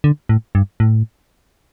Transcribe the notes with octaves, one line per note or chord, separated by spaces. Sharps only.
D3
A2
G2
A2